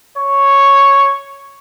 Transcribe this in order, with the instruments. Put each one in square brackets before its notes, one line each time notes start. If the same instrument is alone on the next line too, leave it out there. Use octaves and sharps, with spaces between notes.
[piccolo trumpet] C#5